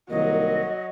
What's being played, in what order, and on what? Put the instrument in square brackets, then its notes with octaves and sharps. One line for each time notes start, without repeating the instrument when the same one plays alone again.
[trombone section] C2 D#3 [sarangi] F#3 [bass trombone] A#3 [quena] D#5